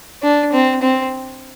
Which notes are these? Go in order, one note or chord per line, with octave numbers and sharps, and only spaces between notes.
D4
C4
C4